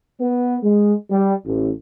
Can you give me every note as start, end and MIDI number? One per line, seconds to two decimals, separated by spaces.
0.20 0.57 59
0.62 0.93 56
1.10 1.33 55
1.45 1.70 33